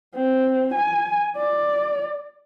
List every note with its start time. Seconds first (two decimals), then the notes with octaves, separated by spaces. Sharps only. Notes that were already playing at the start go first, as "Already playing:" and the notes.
0.15 C4
0.74 G#5
1.37 D5